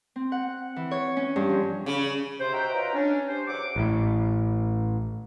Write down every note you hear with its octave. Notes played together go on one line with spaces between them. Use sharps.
C4
F#5
E3
C#5
C#4
G2
F3
C#3
C3 C5
D#4 F#4 C5 E5 G5 A#5
C#4 F4 B4 D#5 A#5
C#4 D4
G4 C5
E2 F#3 F#5 D6
A1 A2